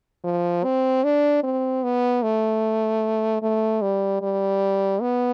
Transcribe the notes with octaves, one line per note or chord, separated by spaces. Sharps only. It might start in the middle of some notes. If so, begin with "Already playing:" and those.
F3
C4
D4
C4
B3
A3
A3
G3
G3
B3